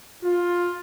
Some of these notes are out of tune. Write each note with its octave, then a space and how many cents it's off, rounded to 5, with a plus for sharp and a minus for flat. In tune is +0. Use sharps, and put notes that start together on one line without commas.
F4 +10